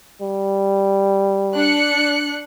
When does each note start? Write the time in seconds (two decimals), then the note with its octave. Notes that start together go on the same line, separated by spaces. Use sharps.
0.21 G3
1.57 D4 F#6 C#7